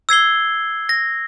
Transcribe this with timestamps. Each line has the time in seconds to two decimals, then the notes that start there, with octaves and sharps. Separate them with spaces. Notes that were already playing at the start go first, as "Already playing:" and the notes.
0.09 E6 G#6 C7 G7
0.89 A#6